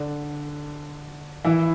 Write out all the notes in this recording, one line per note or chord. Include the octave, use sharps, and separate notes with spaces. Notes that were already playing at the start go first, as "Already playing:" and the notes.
Already playing: D3 D4
E3 E4